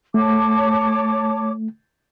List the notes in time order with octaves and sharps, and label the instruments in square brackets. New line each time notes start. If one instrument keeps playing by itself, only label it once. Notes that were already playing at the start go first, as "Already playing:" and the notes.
[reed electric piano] A3 [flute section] C#5 A5 D6